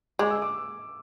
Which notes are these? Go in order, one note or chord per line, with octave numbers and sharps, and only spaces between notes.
G#3 D6
E6
D6